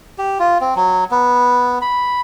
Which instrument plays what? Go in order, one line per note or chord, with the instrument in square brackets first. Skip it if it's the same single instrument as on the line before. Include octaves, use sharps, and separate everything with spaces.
[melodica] G4
F4
C4
F#3
B3
B5